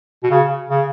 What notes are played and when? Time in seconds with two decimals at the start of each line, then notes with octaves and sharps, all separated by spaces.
0.23 B2
0.31 C#3
0.70 C#3